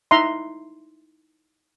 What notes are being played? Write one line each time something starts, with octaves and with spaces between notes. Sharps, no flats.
D#4 E4 E5 A#5 C6